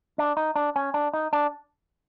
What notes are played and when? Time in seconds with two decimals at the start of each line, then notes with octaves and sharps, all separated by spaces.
0.18 D4
0.37 D#4
0.56 D4
0.76 C#4
0.94 D4
1.13 D#4
1.33 D4